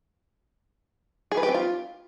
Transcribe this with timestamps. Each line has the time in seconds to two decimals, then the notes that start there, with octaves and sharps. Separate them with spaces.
1.32 G#4
1.37 B4
1.43 G4
1.49 C4
1.54 F4